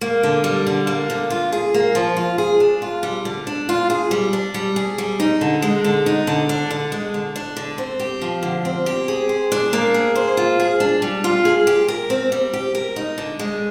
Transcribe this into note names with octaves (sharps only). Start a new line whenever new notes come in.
A#3
D3
G3
D3
A#3
D3
F4
G#4
A#3
F3
F4
G#4
D4
F4
G3
D3
D4
F4
G#4
G3
D4
G3
G#4
G3
D#4
D3
G#3
D3
D#4
D3
D4
D3
G#3
D3
D4
D3
C4
G4
F3
D3
C4
G4
G#4
C5
D4
A#3
G#4
C5
F4
G#4
D4
G3
F4
G#4
G4
A#4
C4
G3
G4
A#4
D#4
D3
G#3